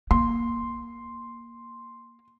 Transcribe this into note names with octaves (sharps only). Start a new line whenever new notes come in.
A#3 C6